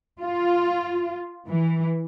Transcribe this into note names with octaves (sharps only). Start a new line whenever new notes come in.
F4
E3